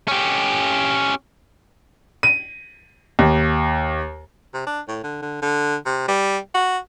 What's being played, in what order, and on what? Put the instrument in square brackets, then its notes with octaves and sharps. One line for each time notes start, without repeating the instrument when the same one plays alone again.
[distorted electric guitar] C#4 G4
[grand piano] D#7
D#2
[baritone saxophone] C3
D4
A2
D3
D3
D3
C3
G3
F#4